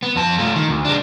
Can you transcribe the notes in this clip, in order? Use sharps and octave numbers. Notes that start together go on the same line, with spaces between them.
B3
F2 A5
A3 F4
D#3
D2
G#3 D4